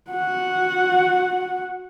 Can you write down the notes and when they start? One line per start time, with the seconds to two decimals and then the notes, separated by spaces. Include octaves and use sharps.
0.11 F#4 F#5